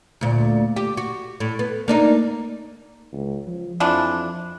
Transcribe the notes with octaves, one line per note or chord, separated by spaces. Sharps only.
D2 A#2
G4
F#4
A2
B3
A#3 D4 D#4
C#2
F3
F2 E3 F3 D4